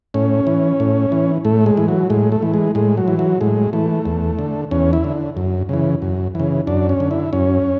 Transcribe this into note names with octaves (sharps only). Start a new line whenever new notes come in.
A2 C#4
E3
A2
E3
A2 A3
G#3
E3
F#3
A2 G#3
A3
E3
G#3
A2 G#3
F#3
E3
F#3
A2 G#3
E3 A3
E2
D3
E2 C#4
E4
D3
F#2
C#3 E3
F#2
C#3 E3
F#2 D4
C#4
D3
E4
F#2 C#4